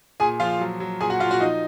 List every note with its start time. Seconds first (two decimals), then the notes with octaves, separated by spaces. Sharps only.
0.20 A#2 G#4 G#5
0.40 F3 F4 F5
0.60 F#3
0.80 F#3
1.01 A#2 G#4 G#5
1.10 F#4 F#5
1.20 A#2 F4 F5
1.31 F#4 F#5
1.40 F3 D#4 D#5